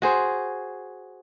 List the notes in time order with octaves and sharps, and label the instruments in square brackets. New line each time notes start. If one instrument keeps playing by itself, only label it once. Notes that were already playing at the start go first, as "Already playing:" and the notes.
[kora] F#4 G#4 C5